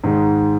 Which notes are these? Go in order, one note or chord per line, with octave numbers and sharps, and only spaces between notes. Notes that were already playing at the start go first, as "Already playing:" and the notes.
G#2 D#3 G#3